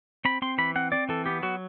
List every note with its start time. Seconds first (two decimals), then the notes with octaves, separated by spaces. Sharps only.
0.25 C4 B5
0.42 C4 C6
0.58 E3 B5
0.75 C4 F#5
0.92 C4 D5
1.09 E3 A4
1.26 B3 G4
1.43 F#3 F#4